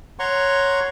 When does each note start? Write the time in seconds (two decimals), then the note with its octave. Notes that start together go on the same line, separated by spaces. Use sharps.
0.19 C#5 F#5 A#5 C6 C#6